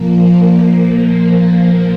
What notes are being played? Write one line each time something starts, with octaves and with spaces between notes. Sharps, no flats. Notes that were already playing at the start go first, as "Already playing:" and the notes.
Already playing: A#2 F3 A#3